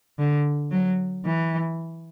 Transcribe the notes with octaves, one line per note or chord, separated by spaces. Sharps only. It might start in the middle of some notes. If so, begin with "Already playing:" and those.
D3
F#3
E3